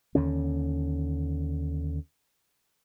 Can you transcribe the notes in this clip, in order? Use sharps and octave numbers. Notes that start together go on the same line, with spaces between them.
D#2 D3 C#4